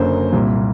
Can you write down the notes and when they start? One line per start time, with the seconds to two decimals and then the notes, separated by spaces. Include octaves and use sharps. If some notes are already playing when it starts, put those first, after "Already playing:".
Already playing: F#1 F#2 D3 F#3 A#3 C5
0.33 C2 A#2 G3